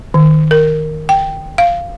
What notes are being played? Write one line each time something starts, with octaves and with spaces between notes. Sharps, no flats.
D#3
A#4
G5
F5